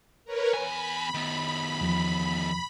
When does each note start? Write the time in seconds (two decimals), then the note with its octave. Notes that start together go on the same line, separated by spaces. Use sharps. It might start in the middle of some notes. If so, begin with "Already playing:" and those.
0.25 A#4 B4 C#5
0.54 E2 G#5 B5
1.14 D#3 B3
1.81 E2 F3